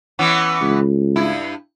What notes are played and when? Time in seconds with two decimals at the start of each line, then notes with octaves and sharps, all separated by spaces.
0.19 E3 B3 C#4
0.61 C#2
1.16 G2 E4